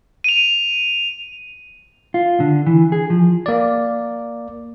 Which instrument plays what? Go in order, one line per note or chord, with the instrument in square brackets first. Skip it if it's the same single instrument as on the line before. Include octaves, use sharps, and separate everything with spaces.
[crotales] D#7 F7
[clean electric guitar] F4
D3
E3
G#4
F3
[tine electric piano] A#3 D5